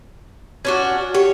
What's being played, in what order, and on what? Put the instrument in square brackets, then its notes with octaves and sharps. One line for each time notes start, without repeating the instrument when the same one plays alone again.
[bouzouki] C#4 D4 F#4
[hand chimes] G4 [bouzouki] C#5